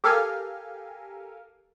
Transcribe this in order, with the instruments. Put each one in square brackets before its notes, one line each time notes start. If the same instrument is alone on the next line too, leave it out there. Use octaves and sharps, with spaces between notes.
[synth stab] G4 A4 A#4 F5 G#5